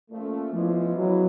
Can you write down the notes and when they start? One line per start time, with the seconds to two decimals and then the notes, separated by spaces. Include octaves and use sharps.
0.10 A#2 F3 A3 A#3 C#4
0.53 C#3 E3 F3 G#3 B3 E4
0.96 C#3 E3 F#3 G#3 B3 E4